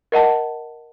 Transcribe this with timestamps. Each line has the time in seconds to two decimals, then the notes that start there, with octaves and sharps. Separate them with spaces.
0.12 A#4 D#5 F#5 A5